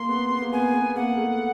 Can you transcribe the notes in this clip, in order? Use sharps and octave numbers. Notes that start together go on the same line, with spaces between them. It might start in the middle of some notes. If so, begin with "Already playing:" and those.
Already playing: A#3 C6
B3
B3
A#3
B3 G#5
B3
A#3 F#5
A3